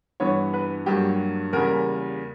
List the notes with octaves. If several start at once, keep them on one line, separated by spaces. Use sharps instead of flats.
G2 E3 B3 C#5
B4
G2 F#3 A#3 G4
E2 C#3 G3 A#3 A#4